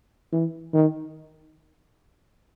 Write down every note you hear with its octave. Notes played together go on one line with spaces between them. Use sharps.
E3
D#3